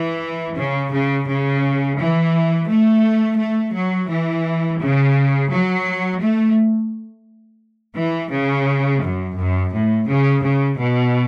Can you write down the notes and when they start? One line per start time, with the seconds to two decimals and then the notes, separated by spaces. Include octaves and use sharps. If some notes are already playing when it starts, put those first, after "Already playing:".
Already playing: E3
0.58 C#3
0.94 C#3
1.28 C#3
1.99 E3
2.69 A3
3.39 A3
3.75 F#3
4.10 E3
4.80 C#3
5.50 F#3
6.21 A3
7.97 E3
8.32 C#3
9.03 F#2
9.37 F#2
9.73 A2
10.08 C#3
10.43 C#3
10.78 B2